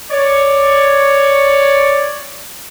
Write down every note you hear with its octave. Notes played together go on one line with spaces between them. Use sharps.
C#5 D5